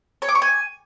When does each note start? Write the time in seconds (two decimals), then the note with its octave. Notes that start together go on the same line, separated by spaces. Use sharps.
0.22 C#5
0.29 D6
0.35 C#6
0.42 G#5